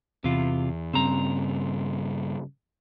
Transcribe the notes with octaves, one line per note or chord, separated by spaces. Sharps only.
E2 C3 F4
G2 C#3 C4 A#5